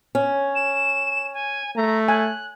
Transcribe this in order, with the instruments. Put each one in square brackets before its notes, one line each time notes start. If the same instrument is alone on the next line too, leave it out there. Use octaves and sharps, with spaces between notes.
[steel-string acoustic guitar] C#4
[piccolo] E7
G#5
[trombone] A3 [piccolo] A#5
[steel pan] G#5 [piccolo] F#6